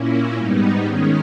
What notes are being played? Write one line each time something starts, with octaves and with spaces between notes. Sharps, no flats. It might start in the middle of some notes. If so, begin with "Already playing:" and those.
Already playing: A#2 A#3 C#4 E4
G#2 G3 B3 D#4
D#3 G#3 C#4